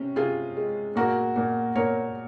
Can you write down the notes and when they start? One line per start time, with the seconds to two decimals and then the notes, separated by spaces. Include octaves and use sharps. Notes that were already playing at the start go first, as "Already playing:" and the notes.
Already playing: C3 C4 C#4
0.16 C3 F4 G#4
0.57 G#3
0.96 A#2 F#4 A#4
1.36 A#2
1.75 A#2 A#4 C#5